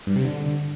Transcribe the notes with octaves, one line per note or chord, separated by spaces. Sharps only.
G2
C3
D3